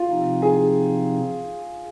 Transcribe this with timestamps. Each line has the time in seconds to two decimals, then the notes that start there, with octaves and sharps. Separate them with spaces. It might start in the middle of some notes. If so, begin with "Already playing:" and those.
Already playing: F4
0.08 C3 F3 C4 D#4
0.42 G#4